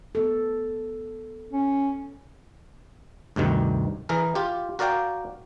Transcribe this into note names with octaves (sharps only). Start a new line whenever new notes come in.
B3 A4
C#4
D2 G2 C3 D#3
E3 G#4 A#4
F4 G4
F#4 A#4 D5 F5 G5